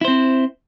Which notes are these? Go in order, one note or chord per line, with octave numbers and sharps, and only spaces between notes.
C4 E4 C5